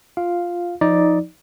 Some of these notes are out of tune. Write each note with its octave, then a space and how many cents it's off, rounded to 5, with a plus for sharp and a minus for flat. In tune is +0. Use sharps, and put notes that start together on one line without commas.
F4 +0 F5 +0
F3 +0 D#4 +15 D5 +0